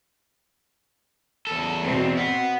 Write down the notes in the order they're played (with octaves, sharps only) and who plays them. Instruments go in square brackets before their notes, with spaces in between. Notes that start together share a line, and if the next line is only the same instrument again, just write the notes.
[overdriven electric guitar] E2 A4
[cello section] B2 C4
[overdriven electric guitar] B3